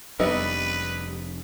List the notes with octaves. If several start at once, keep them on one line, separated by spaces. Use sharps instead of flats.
F1 F2 G3 B3 D4 D#4 B4 E5